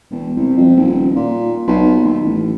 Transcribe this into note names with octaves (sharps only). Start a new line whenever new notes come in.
E1
C2
F2
D#1
A#2
B1
D#2
A1